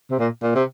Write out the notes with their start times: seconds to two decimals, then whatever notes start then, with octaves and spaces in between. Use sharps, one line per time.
0.11 C3
0.19 A#2
0.42 A#2
0.55 C3